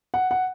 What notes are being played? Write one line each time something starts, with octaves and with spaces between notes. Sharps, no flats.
F#5
F#5